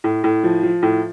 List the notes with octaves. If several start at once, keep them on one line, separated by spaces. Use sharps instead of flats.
A2
A2
F3
F3
A2